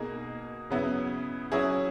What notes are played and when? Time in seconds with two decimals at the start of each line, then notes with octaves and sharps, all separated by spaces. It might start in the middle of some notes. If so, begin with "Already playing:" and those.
Already playing: B2 A#3 D#4 G#4
0.70 C#3 F#3 B3 E4
1.52 F#3 C#4 E4 G#4